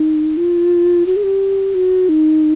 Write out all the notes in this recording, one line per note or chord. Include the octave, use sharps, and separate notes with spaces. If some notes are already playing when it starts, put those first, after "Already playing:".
Already playing: D#4
F4
F#4
G#4
G4
F#4
D#4